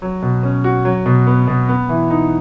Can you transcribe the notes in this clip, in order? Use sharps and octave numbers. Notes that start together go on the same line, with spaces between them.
F#3
B2
C#4
F#4
F#3
B2
B3
B2
B3
E3
D#4